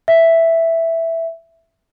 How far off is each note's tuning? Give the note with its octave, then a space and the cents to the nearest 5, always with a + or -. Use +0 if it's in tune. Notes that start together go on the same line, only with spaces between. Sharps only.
E5 +0